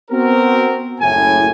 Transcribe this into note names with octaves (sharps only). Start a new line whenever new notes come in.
B3 C4 F#4 A#4
F#1 A2 G#5